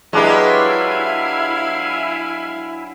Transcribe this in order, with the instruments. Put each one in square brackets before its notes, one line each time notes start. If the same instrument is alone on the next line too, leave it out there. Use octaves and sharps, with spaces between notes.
[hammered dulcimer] F#3 D4 B4 [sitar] G#3 G4 [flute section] E4 [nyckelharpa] F5 G#5